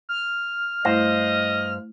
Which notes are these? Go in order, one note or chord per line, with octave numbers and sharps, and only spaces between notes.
F6
G2 A3 E4 C5 D#5 F5 A#6